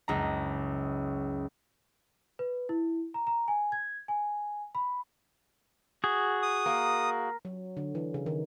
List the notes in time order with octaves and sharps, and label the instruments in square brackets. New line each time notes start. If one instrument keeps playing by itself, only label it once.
[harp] F#1 C#2 A#5
[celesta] B4
E4
A#5
A#5
G#5
G#6
G#5
B5
[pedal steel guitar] F#4 G#4
[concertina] D#6
[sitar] A#3
[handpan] F#3
D3
E3
C#3
D#3